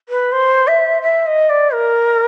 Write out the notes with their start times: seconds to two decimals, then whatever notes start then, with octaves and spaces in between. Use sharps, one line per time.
0.09 B4
0.32 C5
0.67 E5
1.02 E5
1.27 D#5
1.49 D5
1.73 A#4